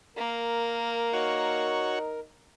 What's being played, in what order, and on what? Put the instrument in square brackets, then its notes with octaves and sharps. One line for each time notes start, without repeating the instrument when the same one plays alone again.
[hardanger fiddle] A#3 [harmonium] A#4
[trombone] D#4 [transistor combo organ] F#4 C#5